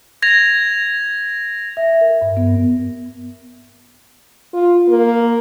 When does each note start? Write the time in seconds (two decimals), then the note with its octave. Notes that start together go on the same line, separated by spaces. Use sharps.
0.22 G#6 A#6 F7
1.77 E5
2.01 A#4
2.22 G2
2.37 B3
4.54 F4
4.89 A#3